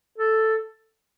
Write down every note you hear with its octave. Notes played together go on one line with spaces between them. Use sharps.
A4